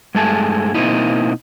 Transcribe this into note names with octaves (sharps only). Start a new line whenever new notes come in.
G2 G#3 A3 G#4 A5
B2 A#3 C4 D#4 E4